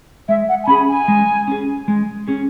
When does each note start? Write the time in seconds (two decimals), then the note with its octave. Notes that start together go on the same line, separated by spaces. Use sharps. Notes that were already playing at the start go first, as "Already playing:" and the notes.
0.28 G#3 E5
0.48 F#5
0.63 G#5
0.67 C#4 G#4 B5
0.88 G#5
1.08 G#3
1.48 C#4 G#4
1.88 G#3
2.28 C#4 G#4